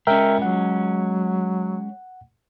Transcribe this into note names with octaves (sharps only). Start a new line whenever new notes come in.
G#3 C#4 A#4 E5 G5
F#3 F#5